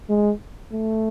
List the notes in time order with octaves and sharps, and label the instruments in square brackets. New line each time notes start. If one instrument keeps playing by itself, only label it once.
[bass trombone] G#3
A3